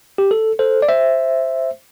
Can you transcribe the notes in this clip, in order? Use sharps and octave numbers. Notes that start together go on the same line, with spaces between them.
G4
A4
A4 C5
D5
C5 E5